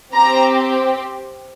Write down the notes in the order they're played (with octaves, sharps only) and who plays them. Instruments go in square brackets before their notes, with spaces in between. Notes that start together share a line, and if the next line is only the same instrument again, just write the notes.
[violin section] C4 G4 A#5